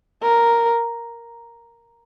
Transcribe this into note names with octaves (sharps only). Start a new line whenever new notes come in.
A#4